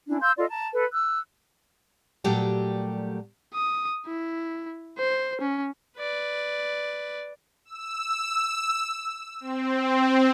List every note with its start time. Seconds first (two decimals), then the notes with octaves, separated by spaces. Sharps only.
0.06 C#4 D4 E4
0.21 F5 C6 E6 G6
0.37 F4 A4 D5 D#5
0.49 A5 A#5
0.72 A4 B4
0.91 E6 F#6
2.24 A#2 F#3 G3 A3 G4
3.54 D#6
4.06 E4
4.98 C5
5.41 C#4
5.98 B4 D5
7.65 E6
9.40 C4